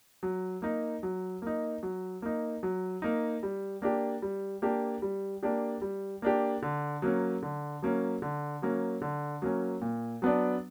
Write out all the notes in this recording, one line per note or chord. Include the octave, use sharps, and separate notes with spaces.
F#3
A#3 D#4
F#3
A#3 D#4
F#3
A#3 D#4
F#3
A#3 D#4
G3
A#3 D4 G4
G3
A#3 D4 G4
G3
A#3 D4 G4
G3
A#3 D4 G4
D3
F#3 A#3 C#4
D3
F#3 A#3 C#4
D3
F#3 A#3 C#4
D3
F#3 A#3 C#4
A#2
F#3 B3 D4